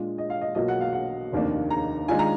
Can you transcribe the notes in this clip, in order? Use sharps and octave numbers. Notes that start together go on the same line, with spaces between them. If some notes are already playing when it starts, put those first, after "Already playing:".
Already playing: A#2 G#3 D4 F4
D#5
F5
D#5
B1 B2 F#3 A#3 F4 D#5
F#5
F5
F#5
F1 D#2 D#3 A#3 D4
A#5
D#3 G#3 D4 F4 G#5
A#5